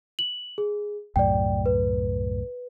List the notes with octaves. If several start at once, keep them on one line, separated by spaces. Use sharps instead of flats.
F#7
G#4
C2 F#2 A2 D5 G5
B4